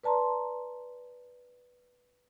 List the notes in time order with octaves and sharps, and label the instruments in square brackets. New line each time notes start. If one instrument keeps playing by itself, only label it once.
[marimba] B4 D5 A5 A#5 C6